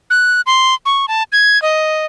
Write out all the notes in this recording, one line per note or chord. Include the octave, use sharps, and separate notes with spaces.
F#6
C6
C#6
A5
G#6
D#5